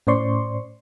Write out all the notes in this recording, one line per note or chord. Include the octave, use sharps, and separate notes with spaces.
A2 C#4 C5 D5 C6 C#6